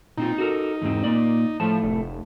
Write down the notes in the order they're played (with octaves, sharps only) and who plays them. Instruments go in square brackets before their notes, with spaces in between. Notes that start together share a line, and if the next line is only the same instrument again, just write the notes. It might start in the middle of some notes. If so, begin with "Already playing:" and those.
[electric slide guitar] A#2 C4 F4 [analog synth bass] D#4
[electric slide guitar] F#4 A4 A#4
E2 G#2 C4
A#2 A#3 D5
[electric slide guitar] A2 A3 A5 [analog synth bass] F3
[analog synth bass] F1